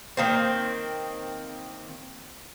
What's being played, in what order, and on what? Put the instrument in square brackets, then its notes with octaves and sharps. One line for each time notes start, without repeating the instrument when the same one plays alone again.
[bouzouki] D#3 A#3 C4